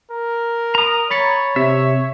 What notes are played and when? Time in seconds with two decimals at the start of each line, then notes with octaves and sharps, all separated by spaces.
0.11 A#4
0.75 A#5 D#6
1.11 C#5 B5 A6 C#7
1.56 C3 E5